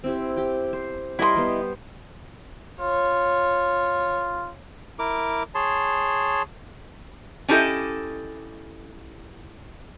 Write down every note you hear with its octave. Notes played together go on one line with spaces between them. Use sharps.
C4 E4 G4
G4 G5
C5
G3 E4 A#4 D#5 C6
G3 B3 C5
F4 C#5
E4 A#4 D6
G#4 C#5 A5 C6
C#4 D4 E4 G4 A4 D#5